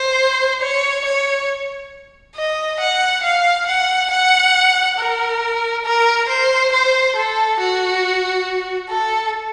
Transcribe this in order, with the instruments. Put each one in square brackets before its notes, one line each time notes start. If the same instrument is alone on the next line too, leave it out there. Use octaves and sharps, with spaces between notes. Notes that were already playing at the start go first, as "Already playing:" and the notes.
Already playing: [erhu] C5
C#5
C#5
D#5
F#5
F5
F#5
F#5
A#4
A#4
C5
C5
A4
F#4
A4